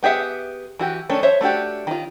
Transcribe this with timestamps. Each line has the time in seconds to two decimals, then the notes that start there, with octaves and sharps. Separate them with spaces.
0.03 B3 G4 G#4 E5 F#5
0.79 E3 F#4 G4
1.09 D#3 A3 C#4 D4
1.23 C5 C#5 E5
1.41 A3 D4 F#4 G4
1.87 D#3 F4